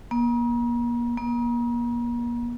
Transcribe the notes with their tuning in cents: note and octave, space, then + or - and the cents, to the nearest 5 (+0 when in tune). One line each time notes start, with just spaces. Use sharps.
A#3 +40
A#3 +40